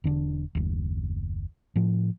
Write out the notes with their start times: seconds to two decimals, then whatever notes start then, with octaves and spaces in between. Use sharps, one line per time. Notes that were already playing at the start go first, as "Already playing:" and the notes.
0.04 E1 D3 D4
0.55 F#1 D#2
1.76 A2 F3